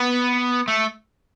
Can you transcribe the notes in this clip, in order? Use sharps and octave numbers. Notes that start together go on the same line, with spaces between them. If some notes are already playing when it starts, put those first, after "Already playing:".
Already playing: B3
A3